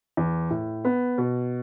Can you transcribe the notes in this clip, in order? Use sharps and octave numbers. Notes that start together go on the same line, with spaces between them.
E2
A2
B3
B2